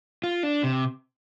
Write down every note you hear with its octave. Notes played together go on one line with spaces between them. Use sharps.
F4
D4
C3